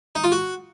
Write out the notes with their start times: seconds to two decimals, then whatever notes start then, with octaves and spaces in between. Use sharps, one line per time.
0.15 D#4
0.24 F4
0.32 F#4